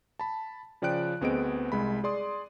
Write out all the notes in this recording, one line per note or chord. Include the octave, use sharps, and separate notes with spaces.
A5 B5
C#3 F3 D5 G5 F#6 D7
D2 B3 C4 G#4 D#5 D7
C2 G#3 B5
G#4 D5 C6 D#6